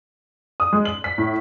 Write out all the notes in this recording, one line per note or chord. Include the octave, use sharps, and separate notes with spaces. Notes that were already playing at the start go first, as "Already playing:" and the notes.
D#6
G#3
F#7
B6
A2